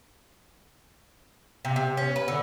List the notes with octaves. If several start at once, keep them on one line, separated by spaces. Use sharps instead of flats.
C3
C3
C#4
B4
D3